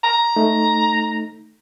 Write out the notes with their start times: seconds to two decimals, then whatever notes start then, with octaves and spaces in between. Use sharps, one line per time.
0.04 A#5
0.36 A3 D#4